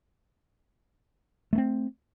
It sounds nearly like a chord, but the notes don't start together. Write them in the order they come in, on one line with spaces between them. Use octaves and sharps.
A3 A#3 C4